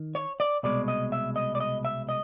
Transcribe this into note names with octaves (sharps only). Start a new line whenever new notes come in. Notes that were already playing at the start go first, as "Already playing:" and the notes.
Already playing: D#3
C#5
D5
C2 B2 G#3 D5
D#5
E5
D#5
D5
D#5
E5
D#5